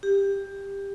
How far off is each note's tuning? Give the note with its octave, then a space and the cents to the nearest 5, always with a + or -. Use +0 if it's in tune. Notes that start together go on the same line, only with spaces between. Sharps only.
G4 +15